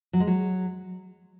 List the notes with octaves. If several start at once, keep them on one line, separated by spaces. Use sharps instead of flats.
F#3
G#3
F#3